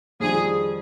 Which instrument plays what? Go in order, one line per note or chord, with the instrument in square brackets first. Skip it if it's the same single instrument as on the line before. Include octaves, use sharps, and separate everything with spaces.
[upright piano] F2 D#3 G3 D4 F4 [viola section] G#4